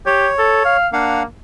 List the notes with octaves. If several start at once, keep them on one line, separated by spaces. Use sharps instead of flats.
G4 C#5
A4
F5
A#3 D4 F5 F#5